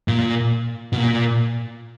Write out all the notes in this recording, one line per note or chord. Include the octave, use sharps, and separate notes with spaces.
A#2
B2
A#2